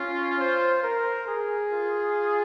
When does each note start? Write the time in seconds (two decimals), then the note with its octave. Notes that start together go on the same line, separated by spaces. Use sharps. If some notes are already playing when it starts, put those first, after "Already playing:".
Already playing: C#4 F4
0.39 C5
0.83 A#4
1.28 G#4
1.72 F4